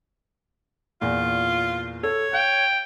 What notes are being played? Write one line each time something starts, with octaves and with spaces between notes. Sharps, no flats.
E2 A#2 F4
A4 C#5
F5 G5